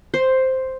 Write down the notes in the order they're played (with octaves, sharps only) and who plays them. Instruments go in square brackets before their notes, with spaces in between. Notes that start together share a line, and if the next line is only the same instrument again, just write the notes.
[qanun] C5